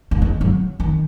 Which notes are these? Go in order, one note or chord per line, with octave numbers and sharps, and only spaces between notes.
A3
G#3
F#3
D#3